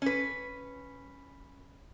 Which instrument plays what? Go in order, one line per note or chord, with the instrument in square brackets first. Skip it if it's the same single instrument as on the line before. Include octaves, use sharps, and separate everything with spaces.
[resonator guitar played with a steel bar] C#4 B4